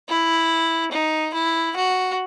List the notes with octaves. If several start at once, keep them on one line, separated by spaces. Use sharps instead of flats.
E4
D#4
E4
F#4